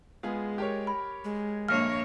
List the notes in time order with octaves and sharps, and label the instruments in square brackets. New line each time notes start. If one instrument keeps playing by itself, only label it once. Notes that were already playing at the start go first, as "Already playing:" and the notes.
[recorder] G#3 [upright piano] B3 F4 G#4
[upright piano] G4 A#4 C#5
[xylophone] B5
[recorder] G#3
[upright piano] A#1 G2 [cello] A#3 C#5 [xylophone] F6